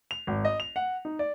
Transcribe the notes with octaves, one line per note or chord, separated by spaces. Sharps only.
F7
G#1
D#5
F7
F#5
D#4
D5